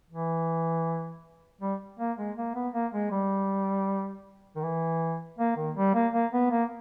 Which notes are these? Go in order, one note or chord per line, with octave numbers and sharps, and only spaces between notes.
E3
G3
A#3
G#3
A#3
B3
A#3
G#3
G3
D#3
E3
A#3
D#3
G3
A#3
A#3
B3
A#3